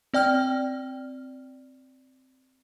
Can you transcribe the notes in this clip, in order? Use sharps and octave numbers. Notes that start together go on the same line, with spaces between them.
C4 D5 G5 F6